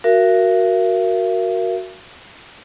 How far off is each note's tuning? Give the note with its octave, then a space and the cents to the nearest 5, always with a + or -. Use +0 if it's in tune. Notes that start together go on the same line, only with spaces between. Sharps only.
F#4 +0 A#4 +0 E5 +45